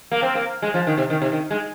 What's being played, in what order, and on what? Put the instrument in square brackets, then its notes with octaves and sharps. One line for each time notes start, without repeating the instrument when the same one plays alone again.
[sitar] A#3
C4
A#3
G#3
F3
D#3
C3
D#3
C3
D#3
G#3